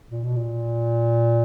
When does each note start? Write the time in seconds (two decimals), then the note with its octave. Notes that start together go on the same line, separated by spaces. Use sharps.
0.11 A#2
0.24 B2
0.36 A#2